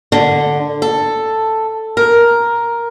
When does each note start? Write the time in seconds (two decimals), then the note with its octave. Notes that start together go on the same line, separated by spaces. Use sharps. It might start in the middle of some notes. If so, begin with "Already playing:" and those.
0.12 D3
0.82 A4
1.97 A#4